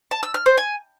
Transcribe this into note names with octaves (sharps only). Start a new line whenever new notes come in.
A5
E6
F6
C5
G#5